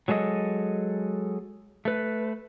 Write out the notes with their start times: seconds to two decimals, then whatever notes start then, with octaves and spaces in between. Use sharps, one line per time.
0.08 F#3 G#3 A4 C5 D#5
1.85 A3 B4